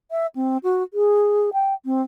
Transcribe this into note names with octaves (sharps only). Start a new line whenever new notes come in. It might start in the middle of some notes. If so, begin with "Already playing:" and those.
E5
C4
F#4
G#4
G5
C4